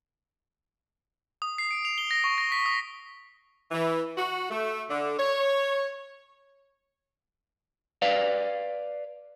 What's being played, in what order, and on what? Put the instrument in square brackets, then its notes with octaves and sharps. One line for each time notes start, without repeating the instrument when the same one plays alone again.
[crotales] D#6
C7
D7
F7
G7
A#6
C#6
A#6
B6
D#6
[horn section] E3
F#4
A3
D3
C#5
[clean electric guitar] B4 D5 F5